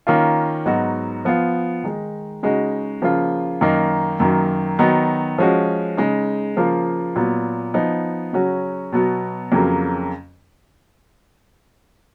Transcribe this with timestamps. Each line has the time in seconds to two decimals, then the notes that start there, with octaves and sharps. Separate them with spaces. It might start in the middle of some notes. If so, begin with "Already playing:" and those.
0.07 D#3 A#3 C#4 F4
0.66 G#2 F#3 B3 D#4 F#4
1.25 F3 B3 F4
1.84 D#3 G#3 D#4
2.43 C#3 G#3 D#4 F#4
3.02 C#3 F3 A#3 F4
3.61 F#2 D#3 A#3 D#4
4.20 F#2 D#3 F#3 A#3
4.79 D#3 F#3 B3 D#4
5.38 F3 G#3 C#4 F#4
5.97 C#3 G#3 D#4
6.57 C#3 F3 A#3 F4
7.15 A#2 F#3 B3
7.74 F3 B3 D#4
8.33 C#3 F#3 C#4 F#4
8.92 B2 F#3 B3 F#4
9.52 F2 C#3 F#3 A#3